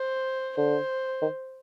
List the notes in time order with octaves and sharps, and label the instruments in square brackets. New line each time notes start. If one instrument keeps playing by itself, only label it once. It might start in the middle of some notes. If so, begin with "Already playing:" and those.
Already playing: [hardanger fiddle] C5
[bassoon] D3 [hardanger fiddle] C5
[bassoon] D#3